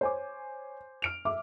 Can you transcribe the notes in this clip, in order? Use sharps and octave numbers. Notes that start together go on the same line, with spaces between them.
C5 C#5 G#5 D6
F6 D7 F7
E5 D6